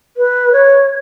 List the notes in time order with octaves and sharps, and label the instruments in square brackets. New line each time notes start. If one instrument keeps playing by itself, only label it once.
[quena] B4
C#5